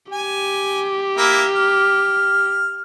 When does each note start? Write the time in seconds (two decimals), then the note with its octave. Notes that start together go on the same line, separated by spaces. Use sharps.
0.12 G4 G#5
1.18 A#3 E4
1.55 F6